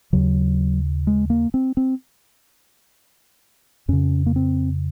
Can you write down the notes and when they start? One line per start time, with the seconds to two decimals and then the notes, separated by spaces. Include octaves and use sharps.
0.13 D#2 C#3 F#3
1.07 G#3
1.30 A#3
1.54 C4
1.77 C4
3.88 F2 C#3 C#4
4.26 A#3
4.36 C4